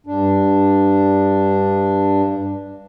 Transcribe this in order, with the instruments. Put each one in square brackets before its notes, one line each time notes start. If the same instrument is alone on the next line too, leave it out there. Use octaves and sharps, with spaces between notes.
[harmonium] G2 D4